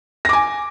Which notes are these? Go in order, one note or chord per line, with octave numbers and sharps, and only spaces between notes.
G#5 D6 A#6